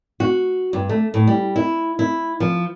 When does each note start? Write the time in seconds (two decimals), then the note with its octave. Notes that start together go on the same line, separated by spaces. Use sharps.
0.20 F#4
0.73 G2
0.89 A3
1.14 A2
1.27 G3
1.56 E4
1.99 E4
2.40 F3